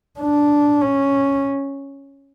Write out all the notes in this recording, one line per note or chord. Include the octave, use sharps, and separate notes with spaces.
D4
C#4